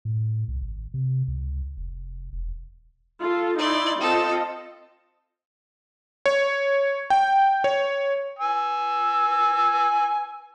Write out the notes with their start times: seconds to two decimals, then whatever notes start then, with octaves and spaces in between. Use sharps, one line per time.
0.05 A2
0.48 C2
0.62 G#1
0.94 C3
1.28 C#2
1.77 F1
2.33 E1
3.20 F4 A4
3.59 D#4 E4 D5 C6
4.01 C4 F4 A4 D#5
6.26 C#5
7.10 G5
7.64 C#5
8.39 G#5 E6